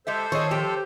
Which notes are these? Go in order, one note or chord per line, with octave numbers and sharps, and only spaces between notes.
G#3 G4 A4 C5 E5
D#3 F4 G#4 C#5 D#5
F3 G4